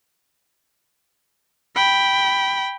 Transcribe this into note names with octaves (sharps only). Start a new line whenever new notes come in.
G5 B5